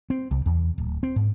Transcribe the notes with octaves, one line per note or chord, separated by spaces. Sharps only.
C4
C2
E2
D1
C4
G#2